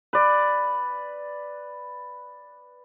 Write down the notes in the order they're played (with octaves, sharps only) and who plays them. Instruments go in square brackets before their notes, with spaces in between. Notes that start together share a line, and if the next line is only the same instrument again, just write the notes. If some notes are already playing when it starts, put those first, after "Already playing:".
[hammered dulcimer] B4 D5